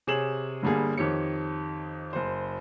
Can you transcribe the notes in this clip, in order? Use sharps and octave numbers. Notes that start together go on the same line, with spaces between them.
C3 G#4 C#5 E7 F#7
G1 D3 G3 A#3 G#4
F2 D#3 G4 C#5 C#7
F#1 C5